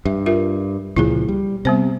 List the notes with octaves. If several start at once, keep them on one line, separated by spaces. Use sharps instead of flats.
G2 E5
F4 A#4 E5
C#2 A#2 F3 E4 G#4
G3
C3 G3 B3 C5